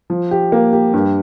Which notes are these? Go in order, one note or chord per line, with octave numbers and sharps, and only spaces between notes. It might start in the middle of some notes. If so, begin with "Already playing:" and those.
F3
G4
A#3
G4
G2